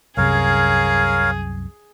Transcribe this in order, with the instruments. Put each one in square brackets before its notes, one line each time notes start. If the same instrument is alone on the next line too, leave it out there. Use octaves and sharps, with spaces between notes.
[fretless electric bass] C2 F#2 C3 [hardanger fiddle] G#4 [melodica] A#4 C#5 F5